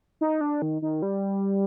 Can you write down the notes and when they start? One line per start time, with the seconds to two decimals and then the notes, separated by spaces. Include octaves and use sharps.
0.21 D#4
0.41 D4
0.62 D#3
0.82 D#3
1.02 G3